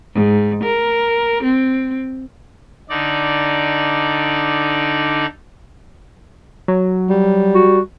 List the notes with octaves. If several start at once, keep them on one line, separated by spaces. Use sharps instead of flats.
G#2
A#4
C4
D3 D#4 D5
F#3
G3
F#4